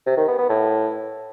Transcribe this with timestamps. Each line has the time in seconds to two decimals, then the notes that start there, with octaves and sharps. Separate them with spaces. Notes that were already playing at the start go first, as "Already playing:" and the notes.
0.06 C3
0.17 D#3
0.28 B3
0.39 B3
0.49 A2